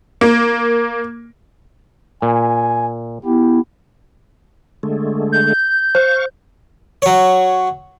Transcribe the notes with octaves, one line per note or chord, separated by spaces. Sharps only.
A#3
A#2 G#5
B3 E4 G4
D3 G#3 A3
G6
C5 F5 C#6
F#3 C#5